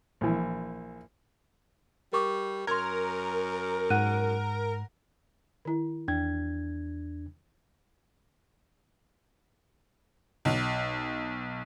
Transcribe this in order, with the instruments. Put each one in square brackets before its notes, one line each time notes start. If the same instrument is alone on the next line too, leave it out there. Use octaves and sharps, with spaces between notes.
[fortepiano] A#1 E3
[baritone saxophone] G3 [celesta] A#4 C#6 D6
[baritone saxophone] F#2 [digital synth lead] A#4 [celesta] C6 G#6
[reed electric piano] G#2 [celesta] F#5 F#6 D#7
[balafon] D#3 E4
[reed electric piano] E2 D4 G#6 [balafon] G5
[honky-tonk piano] B1